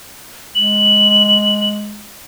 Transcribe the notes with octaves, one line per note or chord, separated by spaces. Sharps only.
G#3 F#7